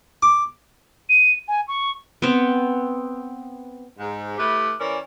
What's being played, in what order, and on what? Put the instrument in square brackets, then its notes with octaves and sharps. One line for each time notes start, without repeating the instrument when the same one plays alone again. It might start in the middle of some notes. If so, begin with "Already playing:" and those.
[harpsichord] D6
[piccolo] D#7
G#5
C#6
[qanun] B3 C4
[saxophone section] G#2
A3 E4 G4 B4
E3 C#4 A#4 D5